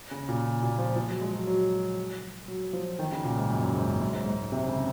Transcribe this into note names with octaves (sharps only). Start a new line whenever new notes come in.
C#3
A#2
A#2
F3
F3
F#3
G#3
F#3
F#3
F#3
F3
D#3
C#3
A#2
G#2
F#2
F#2
G#2
F#2
F#2
G#2
G#2
C3
C#3